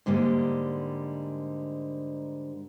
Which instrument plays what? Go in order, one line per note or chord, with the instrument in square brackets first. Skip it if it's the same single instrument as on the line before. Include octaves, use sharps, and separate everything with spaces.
[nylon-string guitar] G#2 D3 G3 A#3